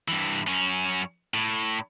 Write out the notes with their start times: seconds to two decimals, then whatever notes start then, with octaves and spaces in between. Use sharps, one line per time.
0.08 G2 E3
0.48 F#2 C#4
1.34 A2